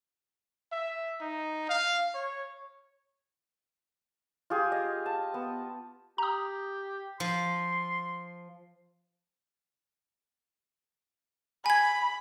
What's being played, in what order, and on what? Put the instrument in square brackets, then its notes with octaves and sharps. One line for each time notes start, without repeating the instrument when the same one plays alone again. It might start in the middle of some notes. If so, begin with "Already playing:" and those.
[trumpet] E5
D#4
F5
C#5
[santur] F4 G4 G#4
D#5
A5
B3
[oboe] G4 [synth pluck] A#5 D#6
[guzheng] F3 [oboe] C6
[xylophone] G#5 G#6 [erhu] B5